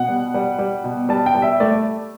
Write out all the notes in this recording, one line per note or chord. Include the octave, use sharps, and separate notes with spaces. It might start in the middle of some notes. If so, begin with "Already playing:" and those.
Already playing: B2 F#5
G3
G3
G3
B2
G3 A5
G5
G3
E5
A3 D5